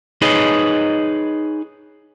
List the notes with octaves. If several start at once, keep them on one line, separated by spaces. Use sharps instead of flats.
D#4 G#4 B4 C#5 D#5